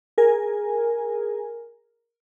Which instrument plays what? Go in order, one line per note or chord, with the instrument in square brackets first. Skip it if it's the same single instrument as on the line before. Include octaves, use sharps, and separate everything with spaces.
[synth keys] G#4 A#4 G#5